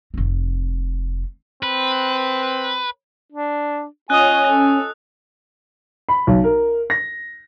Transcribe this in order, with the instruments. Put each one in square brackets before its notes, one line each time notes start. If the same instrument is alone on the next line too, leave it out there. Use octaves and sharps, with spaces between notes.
[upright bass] F1 C4
[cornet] C4 [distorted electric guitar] B4
[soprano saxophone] D4
[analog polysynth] C#4 [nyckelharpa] F4 D#5 [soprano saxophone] G#5 [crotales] D#6 F#6
[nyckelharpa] A4
[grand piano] B5
B1
A#4
A#6